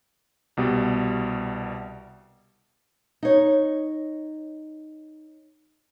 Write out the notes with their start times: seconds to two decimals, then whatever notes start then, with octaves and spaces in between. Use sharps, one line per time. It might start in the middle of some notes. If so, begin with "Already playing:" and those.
0.57 C2 B2 G3
3.23 D#4 C#5